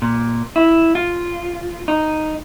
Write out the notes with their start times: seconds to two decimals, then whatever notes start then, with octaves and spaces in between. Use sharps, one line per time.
0.02 A#2
0.56 E4
0.95 F4
1.88 D#4